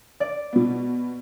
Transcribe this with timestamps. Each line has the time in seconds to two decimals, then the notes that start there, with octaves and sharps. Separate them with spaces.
0.20 D5
0.53 B2 B3